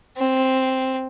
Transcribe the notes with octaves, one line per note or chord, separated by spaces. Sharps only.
C4